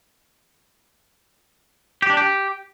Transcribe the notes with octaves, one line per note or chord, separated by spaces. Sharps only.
G4
D4
G4